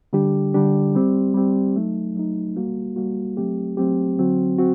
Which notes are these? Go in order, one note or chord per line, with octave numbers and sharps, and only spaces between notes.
D3 G3 D4 G4
D3 G3 D4 G4
G3 C4 G4
G3 C4 G4
F#3 A3 D#4
F#3 A3 D#4
G3 A#3 F#4
G3 A#3 F#4
F#3 A3 C4 G4
F#3 A3 C4 G4
D3 F#3 C4 F#4
C4 F#4